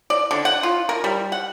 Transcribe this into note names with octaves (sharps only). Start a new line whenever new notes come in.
D5
D3
F#5
F4
A#4
G3
F#5